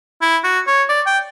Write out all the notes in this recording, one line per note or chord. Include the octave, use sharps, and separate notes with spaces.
E4
F#4
C#5
D5
G5